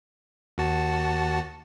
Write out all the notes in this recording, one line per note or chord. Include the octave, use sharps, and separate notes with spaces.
D#2 F#4 A5